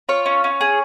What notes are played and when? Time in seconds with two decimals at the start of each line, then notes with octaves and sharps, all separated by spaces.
0.09 F4 C#5
0.26 C#4
0.44 C#4
0.61 G#4